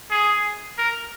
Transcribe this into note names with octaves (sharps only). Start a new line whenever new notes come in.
G#4
A#4